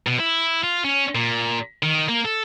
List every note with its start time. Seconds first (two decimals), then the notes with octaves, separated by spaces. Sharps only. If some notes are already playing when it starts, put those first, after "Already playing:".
0.07 B2
0.20 E4
0.64 F4
0.84 C#4
1.15 A#2
1.83 D#3
2.09 A#3
2.25 A4